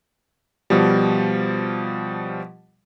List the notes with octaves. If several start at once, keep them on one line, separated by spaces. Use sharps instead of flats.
B2 F3 G3